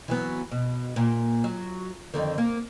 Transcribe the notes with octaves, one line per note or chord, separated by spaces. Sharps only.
E3 F#3 B3
B2
A#2
F#3
F2 D3 D#3
A#3